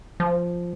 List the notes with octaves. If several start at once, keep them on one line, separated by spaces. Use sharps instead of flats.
F3